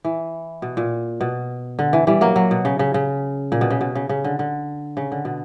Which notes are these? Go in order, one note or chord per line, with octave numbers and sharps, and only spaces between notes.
E3
B2
A#2
B2
D3
E3
E3 G3
F#3 A#3
F#3
B2
C#3
C#3
C#3
A#2
B2
C#3
B2
C#3
C#3
D3
D3
C#3
D3
B2